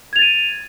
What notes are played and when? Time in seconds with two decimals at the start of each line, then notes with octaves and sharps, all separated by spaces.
0.13 G#6
0.16 F7
0.19 A6
0.22 D#7